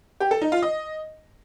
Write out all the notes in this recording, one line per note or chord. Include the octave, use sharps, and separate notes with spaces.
G4
A4
D#4
F4
D#5